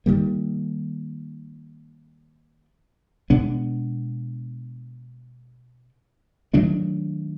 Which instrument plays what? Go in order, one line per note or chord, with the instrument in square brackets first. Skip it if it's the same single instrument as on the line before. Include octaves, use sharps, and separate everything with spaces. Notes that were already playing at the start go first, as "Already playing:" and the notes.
[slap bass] D#3 G3 A#3
B2 G#3 B3 D4
D#3 F#3 A3 D4